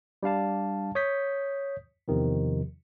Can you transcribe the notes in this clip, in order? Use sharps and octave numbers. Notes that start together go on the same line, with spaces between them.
G3 D4 F5 A5
C#5 D#6 G6 B6
E2 C3 D#3 F3